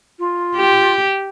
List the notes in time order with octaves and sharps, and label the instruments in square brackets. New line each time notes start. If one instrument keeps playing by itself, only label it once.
[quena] F4
[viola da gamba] G4